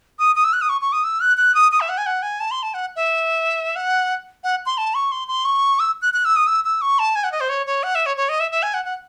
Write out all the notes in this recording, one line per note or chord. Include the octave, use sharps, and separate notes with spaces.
D#6
D#6
E6
F#6
D#6
C#6
C#6
D#6
E6
F#6
F#6
D#6
D#6
E5
F#5
G#5
F#5
G#5
A5
C6
A5
F#5
E5
F#5
F#5
C6
A5
C#6
C6
C6
C#6
E6
F#6
F#6
E6
D#6
E6
E6
C#6
A5
G#5
F#5
D#5
C5
C#5
C#5
F#5
E5
C#5
C#5
D#5
E5
E5
G#5
F#5
F#5